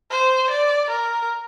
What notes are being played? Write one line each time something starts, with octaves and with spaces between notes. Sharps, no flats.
C5
D5
A#4